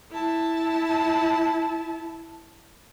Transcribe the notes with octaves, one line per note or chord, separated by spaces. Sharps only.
E4 A5